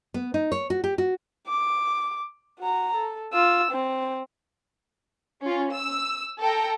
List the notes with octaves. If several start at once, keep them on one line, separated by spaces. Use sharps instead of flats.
B3
D#4
C#5
F#4
G4
F#4
D6
F#4 A#5
A4
F4 E6
C4
C#4 F4
E6
A4 G5 A#5